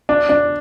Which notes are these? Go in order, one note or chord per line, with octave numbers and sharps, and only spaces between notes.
D4
D4